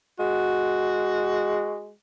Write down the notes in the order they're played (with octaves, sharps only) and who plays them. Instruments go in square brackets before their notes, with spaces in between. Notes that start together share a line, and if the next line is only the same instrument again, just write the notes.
[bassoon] G#3 [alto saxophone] F#4